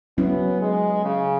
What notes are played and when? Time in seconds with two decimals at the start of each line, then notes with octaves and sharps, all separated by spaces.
0.18 F#3 B3 C#4 E4
0.61 G#3
1.04 C#3